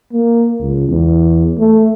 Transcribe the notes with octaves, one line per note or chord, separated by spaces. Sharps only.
A#3
C#2
E2
A3